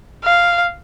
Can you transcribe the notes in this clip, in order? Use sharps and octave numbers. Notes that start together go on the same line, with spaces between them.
F5